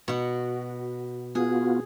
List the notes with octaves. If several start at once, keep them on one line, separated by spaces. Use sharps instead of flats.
B2 F#4
B3 F4 F#4 G#4